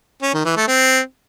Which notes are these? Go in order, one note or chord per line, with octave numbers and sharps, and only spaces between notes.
C#4
D#3
E3
A3
C4